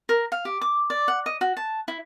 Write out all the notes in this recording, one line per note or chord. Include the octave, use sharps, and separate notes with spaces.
A#4
F5
G4
D6
D5
F#5
D#5
F#4
A5
E4